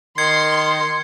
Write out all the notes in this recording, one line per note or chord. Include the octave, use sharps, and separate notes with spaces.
D#3 C6 G#6 C7 C#7